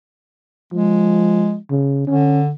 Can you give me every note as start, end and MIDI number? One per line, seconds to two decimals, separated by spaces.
0.72 1.57 53
0.72 1.57 56
1.70 2.04 49
2.07 2.52 50
2.07 2.41 61